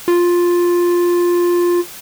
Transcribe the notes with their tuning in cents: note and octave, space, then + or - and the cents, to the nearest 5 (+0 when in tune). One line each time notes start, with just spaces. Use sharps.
F4 +5